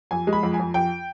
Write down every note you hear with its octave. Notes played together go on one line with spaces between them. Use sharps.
F2 G#5
G#3
B5
F2
G#5
F2
F2 G5